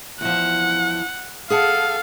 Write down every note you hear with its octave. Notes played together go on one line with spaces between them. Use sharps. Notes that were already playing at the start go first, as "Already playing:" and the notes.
E2 F3 F#5
G#4 A4 F5 F#5 A5